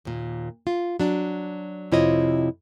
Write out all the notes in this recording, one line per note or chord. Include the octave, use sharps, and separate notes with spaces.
D#2 A#2
F4
F#3 D4
F2 C3 E4 F4 C#5 D#5